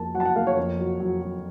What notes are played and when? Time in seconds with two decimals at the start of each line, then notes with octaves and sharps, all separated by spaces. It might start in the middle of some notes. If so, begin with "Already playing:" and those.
Already playing: F2 A#3 A5
0.14 F#3 F#5
0.20 A5
0.25 F#5
0.36 A#3 F5
0.47 C#5
0.57 F2
0.79 F#3
1.00 F#3
1.21 F#3